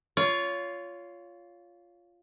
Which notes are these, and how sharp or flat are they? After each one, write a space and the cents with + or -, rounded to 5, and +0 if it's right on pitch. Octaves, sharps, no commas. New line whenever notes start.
F4 +0 C#5 +25